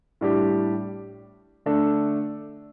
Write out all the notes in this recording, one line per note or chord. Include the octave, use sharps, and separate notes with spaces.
A2 G3 D4 G4
D3 A3 D4 A4